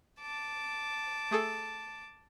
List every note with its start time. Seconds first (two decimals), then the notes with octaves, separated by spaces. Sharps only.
0.20 A5 D6
1.31 A3 G#4 A4